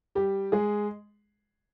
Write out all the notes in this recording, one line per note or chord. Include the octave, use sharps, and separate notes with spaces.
G3 G4
G#3 G#4